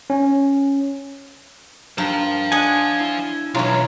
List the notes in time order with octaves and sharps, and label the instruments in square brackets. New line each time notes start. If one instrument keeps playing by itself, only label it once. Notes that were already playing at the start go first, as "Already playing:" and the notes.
[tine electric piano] C#4
[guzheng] G2 A#4 [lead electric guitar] C5 F5
[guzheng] D4 D#5 F#5 [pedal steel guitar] G#5
[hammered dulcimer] E4
[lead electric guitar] B1 [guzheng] E3 F4 [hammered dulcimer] E4 C#5 A#5